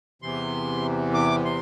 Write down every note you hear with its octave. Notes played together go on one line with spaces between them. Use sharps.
E2 C3 E3 C6
D6
C6